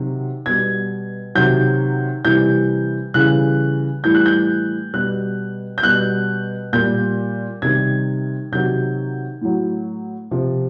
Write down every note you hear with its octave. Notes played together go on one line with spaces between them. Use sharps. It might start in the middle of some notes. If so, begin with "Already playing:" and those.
Already playing: C3 D#3 F#3
B2 G3 G#6
C3 D#3 F#3 G6
C3 E3 G3 G6
C#3 E3 G3 F#6
A2 E3 G3 G6
F#6
G6
B2 G3 F#6
G6
B2 G3 F#6
A#2 G3 G6
C3 D#3 G3 G#6
C3 D#3 F#3 G6
A2 F#3
C3 F3